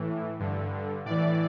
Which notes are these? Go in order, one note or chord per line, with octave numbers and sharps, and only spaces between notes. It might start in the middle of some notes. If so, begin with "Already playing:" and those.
Already playing: A2 E3
G2 D3
A2 E3 D5